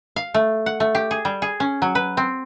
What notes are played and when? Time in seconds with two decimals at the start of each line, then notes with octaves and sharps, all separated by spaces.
0.16 F5
0.34 A3
0.66 F#5
0.80 A3
0.95 G4
1.11 G#4
1.25 G3
1.42 G#4
1.60 C#4
1.82 F#3
1.95 B4
2.17 C4